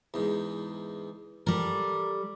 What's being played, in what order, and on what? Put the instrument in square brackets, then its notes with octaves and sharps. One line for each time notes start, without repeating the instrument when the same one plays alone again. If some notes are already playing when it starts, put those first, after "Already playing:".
[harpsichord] E2 G#2
[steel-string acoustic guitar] G3 A4 [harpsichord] A#4 A#5